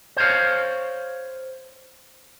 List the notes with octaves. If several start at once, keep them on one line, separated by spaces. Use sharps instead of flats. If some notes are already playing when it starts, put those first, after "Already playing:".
C5 C#5 F5